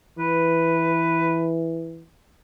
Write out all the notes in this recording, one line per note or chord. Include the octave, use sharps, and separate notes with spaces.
E3 B4